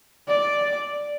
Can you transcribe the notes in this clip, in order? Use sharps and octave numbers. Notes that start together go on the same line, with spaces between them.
D5